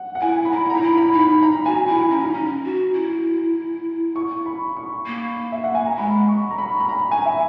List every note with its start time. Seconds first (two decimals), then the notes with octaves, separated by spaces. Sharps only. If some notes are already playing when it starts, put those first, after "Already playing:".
Already playing: F#5
0.15 F#5
0.21 E4 G#5
0.45 B5
0.51 E4 A#5
0.70 A#5
0.74 D#4 B5
0.82 E4
0.97 B5
1.13 D#4
1.19 B5
1.43 A#5
1.66 F#4 G#5
1.88 E4 G#5
2.10 C#4 A#5
2.24 D#4
2.34 C#4
2.64 F#4
2.94 E4
4.16 C#6
4.46 B5
4.77 C#6
5.06 A#3
5.52 E5
5.64 F#5
5.75 G#5
5.86 A#5
5.98 G#3 B5
6.28 C#6
6.51 A#5
6.58 B5
6.80 B5
6.89 A#5
7.11 G#5
7.25 E5